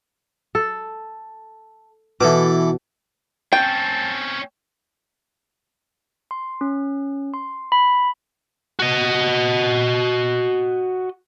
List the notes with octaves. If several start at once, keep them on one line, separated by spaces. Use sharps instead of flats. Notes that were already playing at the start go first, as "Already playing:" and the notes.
A4
B2 E3 A4 D6
C4 C#4 G5 A5
C6
C#4
C6
B5
F#4 D#5